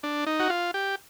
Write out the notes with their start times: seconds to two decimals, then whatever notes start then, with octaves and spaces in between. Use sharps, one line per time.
0.03 D4
0.27 D#4
0.40 F#4
0.50 F4
0.74 G4